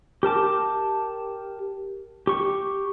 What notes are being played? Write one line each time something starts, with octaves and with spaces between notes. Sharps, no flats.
G4 A#4 A5 D6
G4 C#6